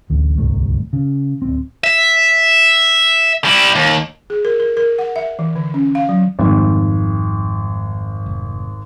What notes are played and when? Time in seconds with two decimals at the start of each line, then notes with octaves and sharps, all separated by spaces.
0.10 A1 D2
0.38 D1 G1 C2 A3
0.93 C#3
1.42 D1 C4
1.84 E5
3.45 G3 E4
3.75 D#2
4.30 G#4
4.45 A#4
4.60 A#4
4.77 A#4
4.99 F#5
5.16 E5
5.39 E3
5.55 D3
5.74 C#4
5.95 F5
6.09 F#3
6.39 G#1 F2 F3 G3
8.26 F1